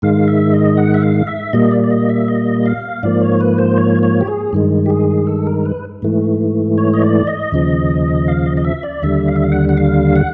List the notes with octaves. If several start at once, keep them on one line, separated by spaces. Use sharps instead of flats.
G#2 D#3 G#3 F5
E5
D#5
F#5
E5
F5
E5
A#2 G3 A#3 D#5
D5
D5
D#5
E5
D#5
F5
G#2 F3 A#3 D5
C#5
B4
C5
C#5
C#5
G4
G#4
G2 D#3 G#3
G4
G#4
A4
A#4
B4
G#2 E3 A3
C#5
D#5
D5
D#5
D#2 C#3 F3
F5
D#5
D#5
E5
D5
D#2 D3 G3 E5
F5
E5
F5
F#5
F#5
F5
F#5